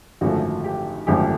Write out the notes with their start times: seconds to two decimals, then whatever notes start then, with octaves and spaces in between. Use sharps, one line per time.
0.21 G#1 F#2 D3 F3 A3 F#4
0.64 G4
1.07 G#1 F#2 D3 F3 A3 G4